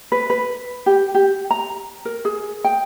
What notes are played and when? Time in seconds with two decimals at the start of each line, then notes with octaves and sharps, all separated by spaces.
0.12 B4
0.30 B4
0.86 G4
1.15 G4
1.51 A#5
2.05 A#4
2.25 G#4
2.65 G5